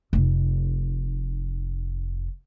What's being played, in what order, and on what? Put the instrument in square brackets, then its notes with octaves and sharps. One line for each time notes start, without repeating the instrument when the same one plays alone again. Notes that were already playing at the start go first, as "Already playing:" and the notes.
[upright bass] F1 D#4